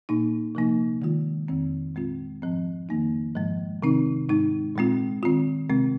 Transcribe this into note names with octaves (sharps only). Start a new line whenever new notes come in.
A#2 A#3 D#4
C3 F3 A#3 D#4
D#3 G#3 F4
F2 D#3 C4
A#2 G#3 C4 F4
G#2 F3 C4
F2 D#3 A#3 D#4
G#2 F3 G#3
C3 D#3 C4 D#4
G#2 G#3 D#4
A#2 G#3 C4 F4
D#3 C4 F4
C3 G#3 C4